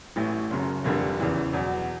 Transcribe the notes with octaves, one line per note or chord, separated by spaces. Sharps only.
A1 A2 E3
F#1 F#2 C#3
F1 F2 D3 G3 A#3
E2 C#3 E3
E2 B2 F#3